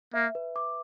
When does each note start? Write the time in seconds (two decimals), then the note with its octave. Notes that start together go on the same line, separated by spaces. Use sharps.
0.14 A#3 E5
0.35 B4
0.56 D6